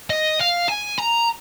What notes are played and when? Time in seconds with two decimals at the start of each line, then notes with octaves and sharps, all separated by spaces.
0.10 D#5
0.40 F5
0.68 G#5
0.98 A#5